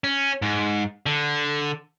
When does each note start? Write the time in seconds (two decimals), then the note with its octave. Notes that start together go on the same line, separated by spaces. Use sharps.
0.04 C#4
0.42 G#2
1.06 D3